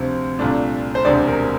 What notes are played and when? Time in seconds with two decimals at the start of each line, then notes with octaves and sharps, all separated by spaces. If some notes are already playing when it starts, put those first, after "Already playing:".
Already playing: D2 C3 F3
0.39 C2 A#2 A3 D4
0.95 C5
1.05 E1 D2 C3 D5
1.27 A#4